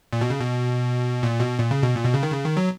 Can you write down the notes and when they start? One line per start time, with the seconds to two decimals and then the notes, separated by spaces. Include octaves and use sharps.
0.13 A#2
0.21 B2
0.30 C#3
0.40 B2
1.23 A#2
1.40 B2
1.59 A#2
1.71 C#3
1.83 B2
1.96 A#2
2.05 B2
2.14 C#3
2.23 D#3
2.32 C#3
2.45 D#3
2.57 F#3